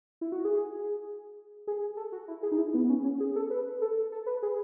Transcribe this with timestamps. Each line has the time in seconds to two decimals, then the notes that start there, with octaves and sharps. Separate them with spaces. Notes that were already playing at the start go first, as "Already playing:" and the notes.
0.21 E4
0.32 F#4
0.45 G#4
1.67 G#4
1.97 A4
2.12 F#4
2.28 E4
2.43 G#4
2.52 D#4
2.58 E4
2.74 B3
2.84 B3
2.90 C#4
3.04 C#4
3.20 G#4
3.36 A4
3.50 B4
3.81 A4
4.12 A4
4.26 B4
4.43 G#4